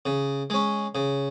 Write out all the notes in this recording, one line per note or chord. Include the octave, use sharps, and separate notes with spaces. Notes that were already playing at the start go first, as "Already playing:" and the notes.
C#3
G#3 C#4
C#3